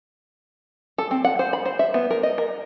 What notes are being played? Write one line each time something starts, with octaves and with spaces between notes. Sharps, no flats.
A4
C4
F#5
C5
B5
C5
E5
B3
A#4
D#5
A#4